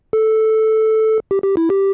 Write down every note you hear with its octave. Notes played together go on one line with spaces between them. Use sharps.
A4
G4
G4
E4
G4